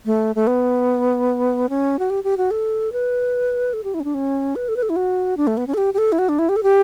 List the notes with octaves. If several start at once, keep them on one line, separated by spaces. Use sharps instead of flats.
A3
A3
B3
C#4
F#4
G4
G4
F#4
A4
B4
A4
G4
E4
C#4
D4
C#4
B4
A4
B4
A4
E4
F#4
D4
A3
B3
C#4
A4
G4
G4
A4
E4
F#4
D4
E4
G4
A4
G4